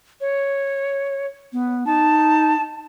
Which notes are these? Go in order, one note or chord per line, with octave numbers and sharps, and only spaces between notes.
C#5
B3
D#4 A5